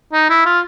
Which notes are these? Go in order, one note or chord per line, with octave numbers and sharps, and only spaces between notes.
D#4
E4
F4